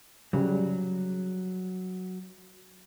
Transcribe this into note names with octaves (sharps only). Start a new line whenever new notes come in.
C#3 F#3 G3